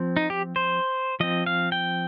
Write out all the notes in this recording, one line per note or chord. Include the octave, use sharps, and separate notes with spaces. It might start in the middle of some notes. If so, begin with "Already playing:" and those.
Already playing: F3 C4
D#4
G4
C5
F3 C4 D#5
F5
G5